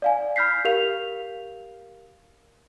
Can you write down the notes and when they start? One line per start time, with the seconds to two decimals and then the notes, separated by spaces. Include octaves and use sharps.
0.02 D5 F5 G#5
0.36 B5 F6 G6 B6 C7
0.65 G4 A#4 F5 F7